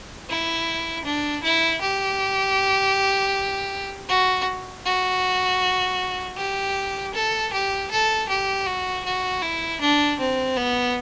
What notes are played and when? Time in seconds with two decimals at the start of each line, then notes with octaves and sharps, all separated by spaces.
0.29 E4
1.05 D4
1.43 E4
1.81 G4
4.09 F#4
4.85 F#4
6.37 G4
7.14 A4
7.52 G4
7.90 A4
8.29 G4
8.66 F#4
9.04 F#4
9.42 E4
9.80 D4
10.19 C4
10.57 B3